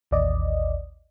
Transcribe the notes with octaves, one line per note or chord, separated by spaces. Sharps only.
A1 D#2 D5 D#5